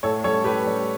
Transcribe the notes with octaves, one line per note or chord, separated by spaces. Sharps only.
A2 A4 C#5
G3 C#4 A4 C#5
A2 G4 B4
G3 C#4